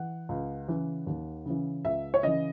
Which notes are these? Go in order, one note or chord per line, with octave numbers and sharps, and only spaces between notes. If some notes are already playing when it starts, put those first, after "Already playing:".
Already playing: E3 F#5
C#2
C#3 E3
D#2
C#3 E3
C#2 E5
C#5
C#3 E3 D#5